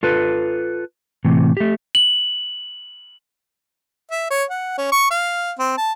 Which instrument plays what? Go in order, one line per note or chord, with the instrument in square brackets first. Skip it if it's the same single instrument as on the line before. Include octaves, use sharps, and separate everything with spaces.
[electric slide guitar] F4 A4 B4
A2 C3 E3
A3 G4
[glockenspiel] F#7
[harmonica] E5
C#5
F#5
C#4
C#6
F5
C4
A5